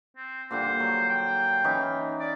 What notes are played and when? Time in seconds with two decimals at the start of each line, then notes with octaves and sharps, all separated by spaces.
0.16 C4
0.51 A#2 D3 G3 C5
0.80 F#3
1.09 G5
1.64 E3 C#4 D#4
2.20 D5